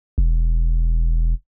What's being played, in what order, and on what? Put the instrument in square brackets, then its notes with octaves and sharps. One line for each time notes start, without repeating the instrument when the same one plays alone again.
[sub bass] E1